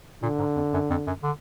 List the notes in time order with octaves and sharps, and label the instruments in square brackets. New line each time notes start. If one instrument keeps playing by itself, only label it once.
[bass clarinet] A#2 [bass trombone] D3
[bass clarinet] G#2
F2
F#2
F2
F#2
D3